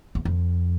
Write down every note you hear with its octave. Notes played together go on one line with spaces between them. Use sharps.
E2
F2